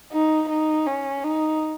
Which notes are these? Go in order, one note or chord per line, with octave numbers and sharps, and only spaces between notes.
D#4
D#4
C#4
D#4